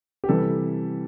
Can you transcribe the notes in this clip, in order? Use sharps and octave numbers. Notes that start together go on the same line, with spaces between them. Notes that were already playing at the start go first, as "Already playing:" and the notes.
G4
C3 E3 G3 A4